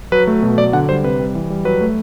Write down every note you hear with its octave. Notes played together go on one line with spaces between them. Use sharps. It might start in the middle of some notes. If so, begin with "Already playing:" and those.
F#3 B4
A3
B2
F#3 D5
D3 F#5
G3 C5
C3 B4
G3
E3
G3
F#3 B4
A3